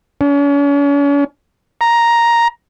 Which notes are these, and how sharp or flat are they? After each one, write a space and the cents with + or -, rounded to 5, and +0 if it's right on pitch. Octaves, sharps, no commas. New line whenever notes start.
C#4 +40
A#5 +5